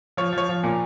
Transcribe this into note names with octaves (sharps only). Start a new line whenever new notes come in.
F3 C#5
F3
C#5
F3
A#2